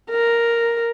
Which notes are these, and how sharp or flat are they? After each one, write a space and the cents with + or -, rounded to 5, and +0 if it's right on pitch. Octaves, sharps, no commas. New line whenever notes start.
A#4 +0